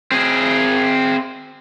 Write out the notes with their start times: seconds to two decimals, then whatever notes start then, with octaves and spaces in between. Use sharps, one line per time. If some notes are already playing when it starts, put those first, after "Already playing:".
0.12 C4 G#4